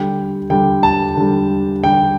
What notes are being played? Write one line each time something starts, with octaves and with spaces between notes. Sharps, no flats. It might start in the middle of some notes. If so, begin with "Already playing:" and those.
Already playing: D3 G3 G5
D3 G3 G5
A5
D3 G3
D3 G3 G5